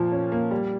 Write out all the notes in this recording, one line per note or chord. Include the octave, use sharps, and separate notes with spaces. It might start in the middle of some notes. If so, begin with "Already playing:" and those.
Already playing: A#2 F3 A#3 A5
C#4
A#3
G3